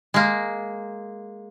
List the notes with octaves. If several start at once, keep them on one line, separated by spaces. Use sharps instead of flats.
G#3 A#3